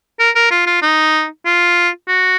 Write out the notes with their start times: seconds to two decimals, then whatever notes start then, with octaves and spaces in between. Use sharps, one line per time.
0.19 A#4
0.35 A#4
0.51 F4
0.66 F4
0.82 D#4
1.45 F4
2.08 F#4